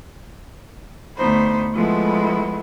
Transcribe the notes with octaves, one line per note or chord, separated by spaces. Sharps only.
D2 B3 D#4 C5 B5
F3 G#3 A3 B3 E4